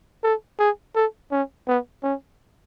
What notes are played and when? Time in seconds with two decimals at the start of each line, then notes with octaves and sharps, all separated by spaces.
0.23 A4
0.59 G#4
0.95 A4
1.31 C#4
1.68 B3
2.03 C#4